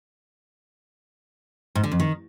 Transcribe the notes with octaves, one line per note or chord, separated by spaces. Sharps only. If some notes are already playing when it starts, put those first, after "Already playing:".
G#2
D3
F2
D#3